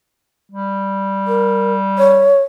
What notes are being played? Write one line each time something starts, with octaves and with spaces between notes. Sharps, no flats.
G3
A#4
C#5